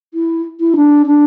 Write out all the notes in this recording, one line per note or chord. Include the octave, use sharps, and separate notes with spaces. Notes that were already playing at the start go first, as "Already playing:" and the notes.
E4
E4
D4
D4